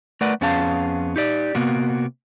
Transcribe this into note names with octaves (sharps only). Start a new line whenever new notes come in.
A3 A#4 B4 D5 F#5
F2 B3 C#4 G#4 F5 A5
D#4 G4 D5
C3 A#3 B3 F#4